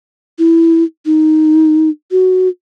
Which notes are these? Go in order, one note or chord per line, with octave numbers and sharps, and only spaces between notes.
E4
D#4
F#4